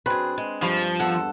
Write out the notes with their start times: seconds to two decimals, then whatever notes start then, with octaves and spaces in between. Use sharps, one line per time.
0.06 F#2 C4 D4 G#4 B4
0.38 G#3
0.62 G2 F3
1.00 E2 A4 F#5